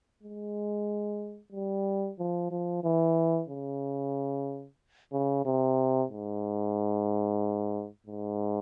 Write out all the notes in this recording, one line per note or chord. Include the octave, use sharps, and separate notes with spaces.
G#3
G3
F3
F3
E3
C#3
C#3
C3
G#2
G#2